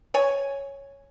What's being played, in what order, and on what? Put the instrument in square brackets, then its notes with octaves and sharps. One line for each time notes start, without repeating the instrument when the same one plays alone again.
[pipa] C#5 G#5